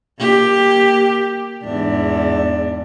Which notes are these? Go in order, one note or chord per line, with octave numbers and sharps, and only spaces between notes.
A#3 G4
E2 G#2 D4